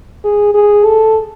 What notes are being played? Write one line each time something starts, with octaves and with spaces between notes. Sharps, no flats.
G#4
G#4
A4